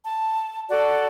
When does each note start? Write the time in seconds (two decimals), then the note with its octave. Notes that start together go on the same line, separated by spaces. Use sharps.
0.04 A5
0.69 F#4 A4 D5